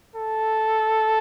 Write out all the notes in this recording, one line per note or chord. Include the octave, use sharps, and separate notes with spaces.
A4